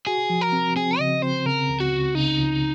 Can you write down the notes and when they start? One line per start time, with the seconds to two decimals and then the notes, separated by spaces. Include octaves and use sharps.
0.07 F#4 G#4
0.30 F3
0.41 A#4
0.52 C4
0.76 C4 G#4
0.99 C#3 D#5
1.22 C4 C5
1.46 C#3 A#4
1.69 C#2
1.80 F#4
1.92 C#2
2.15 C#3 D#4
2.39 C#2